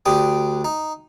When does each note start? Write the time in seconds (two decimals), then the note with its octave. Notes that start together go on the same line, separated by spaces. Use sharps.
0.06 D2 D4 G4 D#6
0.65 D#4